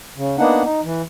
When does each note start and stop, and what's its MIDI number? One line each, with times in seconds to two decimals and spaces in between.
0.17 0.36 49
0.38 0.63 58
0.38 0.63 59
0.38 0.63 62
0.38 0.63 63
0.38 0.63 78
0.64 0.81 63
0.84 1.02 52